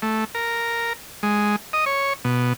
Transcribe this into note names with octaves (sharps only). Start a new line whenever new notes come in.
A3
A#4
G#3
D#5
C#5
B2